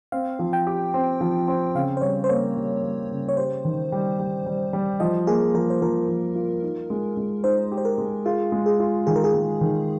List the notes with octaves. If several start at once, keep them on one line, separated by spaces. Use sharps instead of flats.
C4 F5
F3
G5
G4
C4
F3
C4
C#3 F5
C5
G3 C#5
C5
A#3 C#5
G3
G3
C#3
C#5
G4 C5
D#3
G3
G3
G3
G3
F3 D#5
A#3 G#4
F3 A#4
C5
F3 A#4
F3
F4
D#4
G#3
G#3
D#4 C5
G4
C5
A#4
G#3
F4 G#4
G#3
G#4
F4
D#3 G#4
A#4
G#4
G#3
D#3